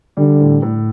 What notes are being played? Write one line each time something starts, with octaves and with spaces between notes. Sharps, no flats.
D3 G3
A2
A2